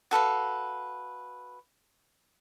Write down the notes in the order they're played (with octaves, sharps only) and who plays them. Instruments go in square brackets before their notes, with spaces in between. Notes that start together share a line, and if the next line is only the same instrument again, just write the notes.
[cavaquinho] F#4 A4 B4 F5